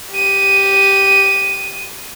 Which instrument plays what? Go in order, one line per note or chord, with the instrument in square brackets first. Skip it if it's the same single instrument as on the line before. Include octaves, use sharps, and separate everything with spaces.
[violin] G4 D#7